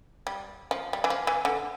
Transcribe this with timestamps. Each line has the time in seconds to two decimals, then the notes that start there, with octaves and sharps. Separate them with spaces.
0.27 G3
0.71 F3
0.93 G3
1.04 E3
1.10 F3
1.27 E3
1.45 D3